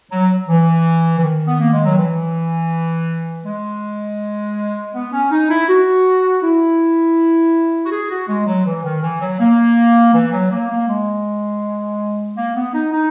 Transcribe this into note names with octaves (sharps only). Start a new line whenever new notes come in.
F#3
E3
E3
D#3
B3
A#3
G#3
F#3
E3
G#3
B3
C#4
D#4
E4
F#4
E4
F#4
G#4
F#4
G#3
F#3
E3
D#3
E3
F#3
A#3
E3
F#3
A#3
A#3
G#3
A#3
B3
D#4
D#4